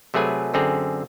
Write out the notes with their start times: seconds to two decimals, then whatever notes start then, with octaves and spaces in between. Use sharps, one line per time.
0.14 C3 F#3 A3 G#4 B4 G#5
0.54 F#2 D3 C4 G#4 A#5